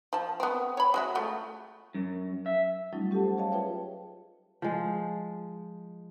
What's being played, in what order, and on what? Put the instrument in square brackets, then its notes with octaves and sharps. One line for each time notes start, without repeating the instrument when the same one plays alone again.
[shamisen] F3 A5
B3 C4
C#5 B5
G#3 F#4 E5
A3 F4
[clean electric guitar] F#2
E5
[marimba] F#3 G3 A3 C#4 D#4 F4
C#4 G4 A4 F#5 A5
C5
G#4 C#5 D#5 F5 A5
F4 G#4 B4 C#5 E5 G5
[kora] F3 G#3